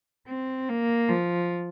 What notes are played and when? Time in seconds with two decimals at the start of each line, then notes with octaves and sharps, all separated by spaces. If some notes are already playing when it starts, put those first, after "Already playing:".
0.28 C4
0.69 A#3
1.09 F3